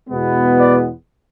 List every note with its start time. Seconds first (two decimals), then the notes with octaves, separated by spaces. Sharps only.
0.09 E2 B2 G#3 B3
0.59 D5